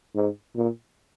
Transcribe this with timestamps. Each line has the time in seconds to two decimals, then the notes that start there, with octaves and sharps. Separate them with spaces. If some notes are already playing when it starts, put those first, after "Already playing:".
0.15 G#2
0.56 A#2